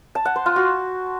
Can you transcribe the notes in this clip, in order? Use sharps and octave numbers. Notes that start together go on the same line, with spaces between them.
A5
F#5
C5
F4
F#4